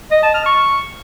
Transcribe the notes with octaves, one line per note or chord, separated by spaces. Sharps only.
D#5
A5
F6
C#6